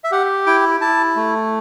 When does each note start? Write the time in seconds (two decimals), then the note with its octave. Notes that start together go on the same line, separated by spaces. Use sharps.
0.04 E5
0.11 G4 F#5
0.46 E4 G5
0.81 E4 A5
1.16 A3